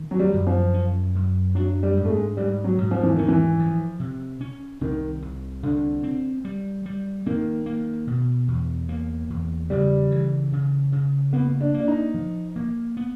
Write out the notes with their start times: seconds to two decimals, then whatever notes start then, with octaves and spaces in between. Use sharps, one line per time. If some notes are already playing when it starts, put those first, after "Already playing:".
Already playing: D#3
0.11 F#3
0.19 G3
0.34 F#2
0.47 F3
0.74 C#4
1.15 F#2
1.55 F#3 D4
1.83 G3
1.97 G#2
2.05 A3
2.10 G#3
2.37 G#2 G3
2.64 F#3
2.78 G#2
2.91 F3
3.03 E3
3.16 D#3 C#4
3.28 E3
3.59 F3
4.00 C3
4.41 C#4
4.81 C2 D#3
5.22 C2
5.63 C2 D3
6.03 C4
6.45 G3
6.86 G3
7.26 D#3 A#3
7.66 A#3
8.07 B2
8.48 E2
8.89 A#3
9.30 E2
9.70 C#3 G3
10.11 E3
10.52 C#3
10.92 C#3
11.33 A#3 B3
11.61 D4
11.74 A#3
11.80 D4
11.88 D#4
12.14 F3
12.56 A#3
12.97 B3